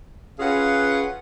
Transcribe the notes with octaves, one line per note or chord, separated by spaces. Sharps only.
C#4 F4 G#4 B4 F5 F#5